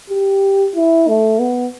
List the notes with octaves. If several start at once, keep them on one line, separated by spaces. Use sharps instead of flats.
G4
E4
A3
B3